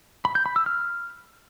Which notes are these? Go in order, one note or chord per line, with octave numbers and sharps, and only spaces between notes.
B5
G6
B5
E6
F6